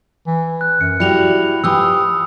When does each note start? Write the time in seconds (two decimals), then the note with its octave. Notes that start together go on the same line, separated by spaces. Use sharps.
0.27 E3
0.61 F#6
0.81 F#2 F6 C#7
1.00 G3 E4 F#4 G4 C#7 F7
1.64 E3 F3 G4 B5 D#6 E6